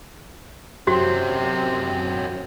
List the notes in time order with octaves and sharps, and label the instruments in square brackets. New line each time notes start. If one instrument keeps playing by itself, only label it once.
[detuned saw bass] F#2 [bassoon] C3 [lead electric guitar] F#3 C4 [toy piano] F#4